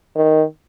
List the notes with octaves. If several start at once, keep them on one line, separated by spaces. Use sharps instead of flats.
D#3